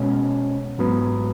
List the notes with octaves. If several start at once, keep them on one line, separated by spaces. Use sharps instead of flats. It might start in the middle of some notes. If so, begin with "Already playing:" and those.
Already playing: B2 G#3 C#4
G#2 F#3 B3